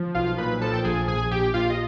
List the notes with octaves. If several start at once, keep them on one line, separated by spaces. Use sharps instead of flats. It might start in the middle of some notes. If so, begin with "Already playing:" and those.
Already playing: F3
B1 F4 F5
A#2 B4 B5
F3 A4 A5
G5
A#1 G#4 G#5
A#1 G#4 G#5
A#1 G4 G5
A#1 F4 F5
D#5